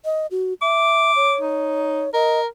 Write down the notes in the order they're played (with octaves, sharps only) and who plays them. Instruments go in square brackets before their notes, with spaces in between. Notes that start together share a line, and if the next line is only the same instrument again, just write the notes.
[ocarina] D#5
F#4
[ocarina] E5 [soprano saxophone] D6
[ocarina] C#5
[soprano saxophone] D#4
[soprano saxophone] A#4 [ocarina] D#5